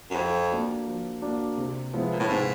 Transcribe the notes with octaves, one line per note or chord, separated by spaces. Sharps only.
F#2
F2 F3
A#3 D4 F#4
F3
A#3 D4 F#4
C3
F3 G#3 B3 E4
A#2
A2
G#2 C3